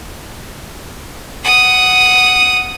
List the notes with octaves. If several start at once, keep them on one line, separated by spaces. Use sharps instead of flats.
F#5 D#6